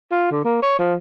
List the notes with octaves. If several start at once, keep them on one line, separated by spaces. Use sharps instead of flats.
F4
D3
A#3
C#5
F3